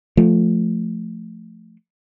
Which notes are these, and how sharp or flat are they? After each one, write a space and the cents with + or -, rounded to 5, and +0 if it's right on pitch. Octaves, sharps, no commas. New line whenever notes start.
F3 +0 A3 +0